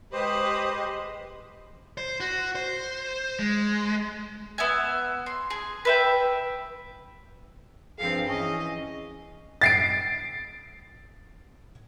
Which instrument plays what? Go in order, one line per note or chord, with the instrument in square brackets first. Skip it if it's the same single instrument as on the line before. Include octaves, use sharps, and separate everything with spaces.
[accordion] G#3 G4 C5 [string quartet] B4 D#5
[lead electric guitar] C5
F#4
C5
G#3
[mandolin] B3 E5 G#5
C6
G#4
B4 E5 G5
[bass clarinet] G2 [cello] F3 C4 [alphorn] G#4 [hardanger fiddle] F5
[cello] E3 [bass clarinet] C#4 [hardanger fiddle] D#5
[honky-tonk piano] A6 C7 D7